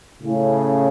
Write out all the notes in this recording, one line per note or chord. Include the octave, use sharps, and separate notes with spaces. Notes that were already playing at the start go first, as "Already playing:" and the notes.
A2 C#3